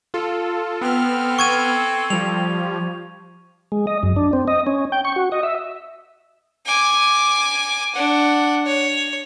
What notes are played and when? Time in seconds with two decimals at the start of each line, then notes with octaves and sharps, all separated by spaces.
0.14 F4 A4
0.81 B3 C4 A4 F6
1.39 C#6 G#6 D#7
2.10 F3 G3 F7
3.72 G#3
3.87 D#5
4.03 F#2
4.16 D4
4.33 C4
4.48 D#5
4.67 C#4
4.92 G5
5.05 C#6
5.16 F#4
5.32 D#5
5.43 E5
6.66 G#5 D6
7.95 D4 F#5
8.66 C#5